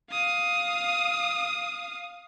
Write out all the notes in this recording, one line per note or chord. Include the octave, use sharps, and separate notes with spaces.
F5 D#6